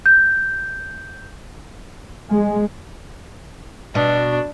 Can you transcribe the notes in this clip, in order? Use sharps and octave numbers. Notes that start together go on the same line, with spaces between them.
G6
G#3
B2 D4